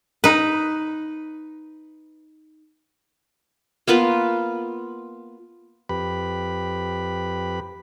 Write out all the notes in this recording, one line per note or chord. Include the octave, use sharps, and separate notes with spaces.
D#4 B4
A#3 B3 F4 B4
F2 G4 B4 B5